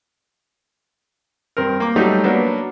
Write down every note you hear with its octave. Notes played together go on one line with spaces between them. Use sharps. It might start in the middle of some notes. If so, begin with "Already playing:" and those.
G2 C4 A#4
A#3 D6
F#3 G3 A3 D#4
F#3 A#3 B3 D4